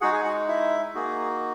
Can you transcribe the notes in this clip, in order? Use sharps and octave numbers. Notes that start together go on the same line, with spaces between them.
G#3 D#4 F#4 G#4 F#5
G#4 G#5
F#4 F#5
E4 E5
A#3 D#4 F#4 G#4